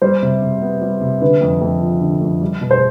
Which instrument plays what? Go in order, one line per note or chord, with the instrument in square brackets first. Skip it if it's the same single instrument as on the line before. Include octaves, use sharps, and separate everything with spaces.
[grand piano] G3 [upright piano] C5
[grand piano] C3
C3
B3
G3
C3
[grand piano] D3 [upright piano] B4
[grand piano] F2
F2
F3
D3
F2
G3
B2
[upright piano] C5